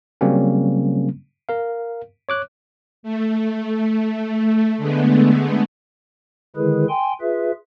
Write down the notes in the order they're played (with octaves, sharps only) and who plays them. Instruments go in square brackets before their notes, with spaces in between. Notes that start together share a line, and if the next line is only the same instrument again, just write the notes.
[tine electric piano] C#3 F#3 G3 A#3 C4 C#4
A#4 F5
C#5 D6 F#6
[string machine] A3
D3 G#3 A3 B3
[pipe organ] D3 D#3 G#3 E4 G#4 B4
G5 G#5 C6
F4 G#4 B4 E5